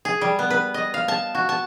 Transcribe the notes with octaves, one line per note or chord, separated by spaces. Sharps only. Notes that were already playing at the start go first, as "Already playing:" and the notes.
G#4
G3
B3
B4
D#5
F5
A5
F#4
A5